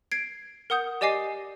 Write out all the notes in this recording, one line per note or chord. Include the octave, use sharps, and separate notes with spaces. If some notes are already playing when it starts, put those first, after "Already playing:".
G#6 C7 D7
A#4 F#5 D#6 G6
G4 D5 D#5 G#5 D6 C7